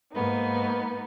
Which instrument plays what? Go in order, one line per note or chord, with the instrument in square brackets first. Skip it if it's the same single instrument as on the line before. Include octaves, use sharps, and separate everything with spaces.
[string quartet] G#2 A#3 B3 D#4